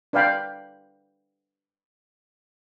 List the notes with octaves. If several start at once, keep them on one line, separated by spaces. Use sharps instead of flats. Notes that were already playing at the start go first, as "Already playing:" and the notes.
D4 B4 D5 F5 G5 B5